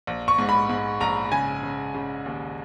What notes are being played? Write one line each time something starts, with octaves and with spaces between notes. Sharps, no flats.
A#1
C#6
G#2
B5
G#2
A#1 A#5
C#3 G#5
C#3
C#3
D#2